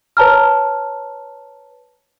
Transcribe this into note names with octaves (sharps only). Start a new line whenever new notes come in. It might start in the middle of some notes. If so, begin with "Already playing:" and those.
B4 C#5 A5 A#5 F6